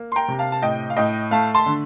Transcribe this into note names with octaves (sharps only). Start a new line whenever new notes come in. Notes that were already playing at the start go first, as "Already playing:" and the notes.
Already playing: A#3
C6
G5 A#5
C3 A#5
F5 A5
A5
A2 D#5 G5
F5
A2 D#5 G5
A3 F5 A5
A5 C6
D3